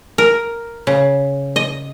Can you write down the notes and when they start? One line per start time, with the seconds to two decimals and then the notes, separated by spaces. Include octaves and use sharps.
0.18 A#4
0.87 C#3
1.56 D#5